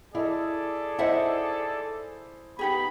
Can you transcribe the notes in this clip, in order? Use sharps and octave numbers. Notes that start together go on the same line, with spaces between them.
E4 G#4 A4 D5 D#5
D#4 E4 C5 D#5 E5 F#5
B3 D#4 G4 G#4 B5